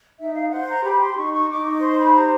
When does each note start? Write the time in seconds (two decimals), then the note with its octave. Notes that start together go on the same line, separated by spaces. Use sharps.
0.18 D#4 E5
0.34 F5
0.50 C5 F#5
0.67 A#5
0.83 G4 B5
0.99 C6
1.16 D#4 C#6
1.32 C#6
1.49 D#4 D6
1.65 C#6
1.82 C5 C6
1.98 B5
2.15 G4 A#5